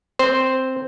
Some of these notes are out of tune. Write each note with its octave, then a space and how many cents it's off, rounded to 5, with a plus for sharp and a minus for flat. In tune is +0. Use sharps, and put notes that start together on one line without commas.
C4 +0 C5 +0